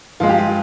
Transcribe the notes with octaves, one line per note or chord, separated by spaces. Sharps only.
G2 F3 G#3 F4
G4
F4